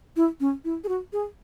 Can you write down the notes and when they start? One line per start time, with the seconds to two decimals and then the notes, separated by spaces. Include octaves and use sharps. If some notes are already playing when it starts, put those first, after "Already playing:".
0.16 E4
0.40 C#4
0.65 E4
0.84 G#4
0.89 F#4
1.13 G#4